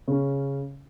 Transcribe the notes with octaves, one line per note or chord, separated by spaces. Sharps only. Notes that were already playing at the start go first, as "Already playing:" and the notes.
C#3 C#4